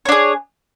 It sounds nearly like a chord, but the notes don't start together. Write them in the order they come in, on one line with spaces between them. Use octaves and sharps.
C#5 D4 G#4